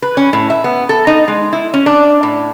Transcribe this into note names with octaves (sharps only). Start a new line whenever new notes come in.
B4
C#4
A2
E5
B3
A4
D#4
G#3
E4
C#4
D4
A2